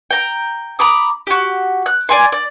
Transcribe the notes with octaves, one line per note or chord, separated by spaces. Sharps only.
G5 A#5
A#5 B5 D6 D#6
F#4 G4
F#6
D5 G#5 C6
D5